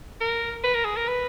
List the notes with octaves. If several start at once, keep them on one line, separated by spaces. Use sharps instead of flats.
A#4
B4
A#4
G#4
A#4
B4